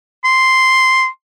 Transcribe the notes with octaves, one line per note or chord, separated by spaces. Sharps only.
C6